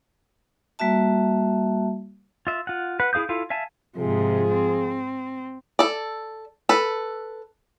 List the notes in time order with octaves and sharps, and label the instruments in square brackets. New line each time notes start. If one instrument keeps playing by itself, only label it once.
[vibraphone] G3 A#3 F#4 E5 A5
[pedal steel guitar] F4 E5
F4 F#5
B4 F#5
E4 G#4 F5 D#6 G6
E4 F4 A4 F5
E5 F5 G#5 A5
[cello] G#2 C3 [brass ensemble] F3 F4 G#4
[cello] C4
[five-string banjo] A4 D5
A4 B4